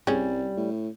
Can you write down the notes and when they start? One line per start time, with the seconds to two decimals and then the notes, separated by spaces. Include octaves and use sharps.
0.07 C2 G3 C#4 G#4
0.57 A2